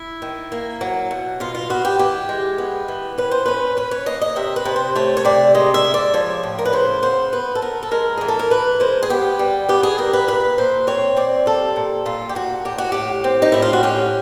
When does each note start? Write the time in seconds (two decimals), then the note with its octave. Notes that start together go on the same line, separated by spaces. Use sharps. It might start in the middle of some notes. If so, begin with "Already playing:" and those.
Already playing: E4
0.22 D#3
0.52 A#3
0.81 F#3
1.11 B2
1.40 B2 F4
1.55 F4
1.70 B3 F#4
1.85 G4
1.99 E3 G4
2.29 G#3
2.58 B3
2.88 E3
3.18 C#4 B4
3.31 C5
3.46 C#4 B4
3.77 C#4 B4
3.91 C#5
4.06 A#3 D#5
4.22 D#5
4.36 C3 E5
4.56 B4
4.65 C3
4.76 C5
4.95 A3 C#5
5.17 C#5
5.25 C3 D5
5.54 G#3 D#5
5.74 E5
5.84 G#3
5.94 D5
6.14 F3 C#5
6.43 A2
6.59 A#4
6.65 B4
6.73 C#3 C5
7.02 B3 C5
7.32 B3 B4
7.55 A4
7.62 B3 A#4
7.83 A4
7.91 G#3 A#4
8.17 E3 G#4
8.28 A4
8.39 A#4
8.50 E3 B4
8.80 G#3 C5
9.03 G#4
9.09 B3 G4
9.39 G3
9.69 B3 G4
9.83 G#4
9.98 G3 A#4
10.13 B4
10.28 A#2 B4
10.58 A#2 C5
10.87 C4 C#5
11.17 C4 D5
11.46 G3 A4
11.76 A#2
12.06 A#2 F4
12.29 G4
12.35 A#2 F#4
12.65 A2 G4
12.78 F#4
12.92 A2 G4
13.24 C4
13.42 D#4
13.52 A2 E4
13.62 F4
13.73 F#4
13.83 C#4 G4